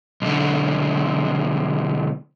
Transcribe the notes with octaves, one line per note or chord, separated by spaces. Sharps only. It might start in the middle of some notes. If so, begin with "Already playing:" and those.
B1 D3